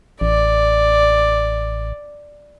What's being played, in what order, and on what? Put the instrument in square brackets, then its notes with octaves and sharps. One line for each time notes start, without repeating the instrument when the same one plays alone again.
[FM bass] A1 [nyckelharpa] D5